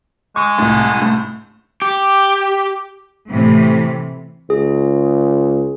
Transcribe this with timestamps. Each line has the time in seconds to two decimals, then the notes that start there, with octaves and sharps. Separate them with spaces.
0.36 G#3 C#6
0.58 C2 A2
1.02 A2
1.82 G4
3.30 A2 C3 E3
4.50 C#2 G#4